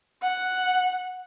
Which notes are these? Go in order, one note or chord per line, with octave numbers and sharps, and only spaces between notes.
F#5